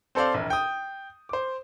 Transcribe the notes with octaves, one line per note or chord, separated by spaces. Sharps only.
C4 A4 C5 D5 F5
E1 A#1
G5 D#6
C5 D6